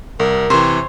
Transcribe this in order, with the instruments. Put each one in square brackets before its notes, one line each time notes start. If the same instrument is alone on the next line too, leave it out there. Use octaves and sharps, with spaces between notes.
[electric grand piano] C2 [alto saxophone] A#4
[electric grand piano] C3 E3 [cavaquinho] C5 C#5